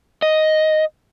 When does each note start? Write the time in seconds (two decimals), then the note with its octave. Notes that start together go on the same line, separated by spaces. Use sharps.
0.22 D#5